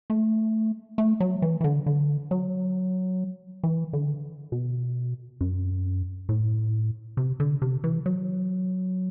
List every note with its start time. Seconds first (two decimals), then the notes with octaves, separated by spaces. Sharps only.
0.10 A3
0.98 A3
1.20 F#3
1.42 E3
1.61 E3
1.64 D3
1.86 D3
2.31 F#3
3.63 E3
3.93 D3
4.52 B2
5.41 F#2
6.29 A2
7.17 C3
7.40 D3
7.62 C3
7.84 E3
8.06 F#3